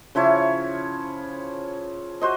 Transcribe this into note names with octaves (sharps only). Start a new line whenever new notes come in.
C#3 F3 E4 C#5
F#4 C5 D#5